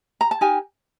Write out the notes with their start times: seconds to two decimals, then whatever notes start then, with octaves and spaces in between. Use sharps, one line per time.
0.21 A#5
0.31 A5
0.41 D#4 G4 A#4 G#5